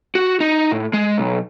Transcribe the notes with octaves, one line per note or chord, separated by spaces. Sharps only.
F#4
D#4
A2
G#3
B1